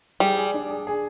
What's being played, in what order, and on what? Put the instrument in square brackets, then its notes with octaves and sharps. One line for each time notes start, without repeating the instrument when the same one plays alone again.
[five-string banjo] G3 [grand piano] G#4
[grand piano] G#4
D4
G#4
G#4